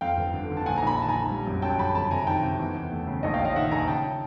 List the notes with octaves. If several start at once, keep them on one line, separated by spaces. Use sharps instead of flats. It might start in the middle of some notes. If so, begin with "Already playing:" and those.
F2 F5 G5
G1
D3
D3
A5
A#1 F#5 G#5
G#5 A#5
A#1 B5
A#5
D#3 A5
G#5 A#5
A#1
G3
F#2
F#2 G5 A5
D3 A5 B5
F2 A5 B5
C3 G#5 A#5
D#3 G5 A5
C3
E2
E2
A3
C#3
A#1 C#5 D#5
F5 G5
A#1
D#5 F5
D#3 E5 F#5
A#1 G#5 A#5
C#3 G5 A5